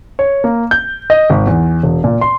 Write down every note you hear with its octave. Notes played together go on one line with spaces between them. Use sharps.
C#5
A#3
G6
D#5
G#1
E2
E1
A#2
C6